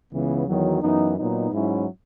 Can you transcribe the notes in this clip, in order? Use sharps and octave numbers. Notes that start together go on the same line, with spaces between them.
C#2 C#3 E3 B3
E2 D#3 F#3
F#2 E3 B3 D#4
A#2 F#3 B3 D#4
G#2 F#3 C#4 E4